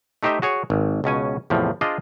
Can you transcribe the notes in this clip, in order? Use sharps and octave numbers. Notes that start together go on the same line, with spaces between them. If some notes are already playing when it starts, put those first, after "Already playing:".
A3 D#4 G4 C5 D#5 E5
F#4 G#4 C#5
G#1
C#2 B2 C#4 G#5
E2 A2 C3 F3
D4 F4 G#4 C5 D5 D#5